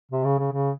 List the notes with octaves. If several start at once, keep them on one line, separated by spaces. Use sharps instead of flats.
C3
C#3
C#3
C#3